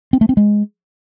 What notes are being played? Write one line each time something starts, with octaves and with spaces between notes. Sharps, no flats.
C4
A3
C4
G#3